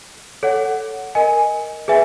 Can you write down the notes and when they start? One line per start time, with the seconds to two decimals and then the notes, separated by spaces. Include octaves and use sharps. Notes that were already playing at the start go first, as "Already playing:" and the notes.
0.43 A4 C#5 F#5
1.15 A#4 D#5 G#5
1.88 G#4 B4 E5 G#5